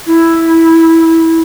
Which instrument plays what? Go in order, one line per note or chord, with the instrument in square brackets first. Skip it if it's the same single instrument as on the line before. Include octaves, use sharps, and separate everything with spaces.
[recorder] E4